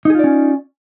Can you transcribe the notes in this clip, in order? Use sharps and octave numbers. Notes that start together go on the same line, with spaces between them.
C#4 D#4 F4 G#4 D5